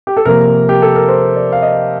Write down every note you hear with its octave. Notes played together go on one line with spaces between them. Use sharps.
G4
A4
C3 F3 A#3 A#4
G4
A4
A#4
C5
D5
F5
D#5